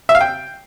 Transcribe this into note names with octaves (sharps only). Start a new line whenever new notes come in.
E5
F5
G5